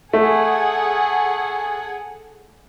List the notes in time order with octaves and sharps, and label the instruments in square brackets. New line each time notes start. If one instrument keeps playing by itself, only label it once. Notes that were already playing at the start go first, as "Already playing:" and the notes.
[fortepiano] A3 [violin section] G#4 A4 F#5